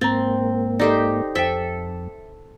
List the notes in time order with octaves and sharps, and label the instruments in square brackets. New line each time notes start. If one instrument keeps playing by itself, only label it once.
[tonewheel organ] G#2 A#3 [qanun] C4 [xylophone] A#5 A6
[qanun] D#4 G4 C5 [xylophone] A4 D5
[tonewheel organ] F2 [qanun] A4 E5 [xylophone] C5 G5